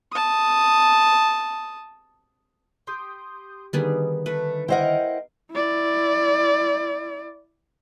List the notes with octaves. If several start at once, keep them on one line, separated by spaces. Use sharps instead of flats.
A5 D#6
G4 C6 D#6 G6
D3 D#3 G3 B3 G#4
A3 B4
E4 A#4 C5 D#5 F#5 G5
E4 D5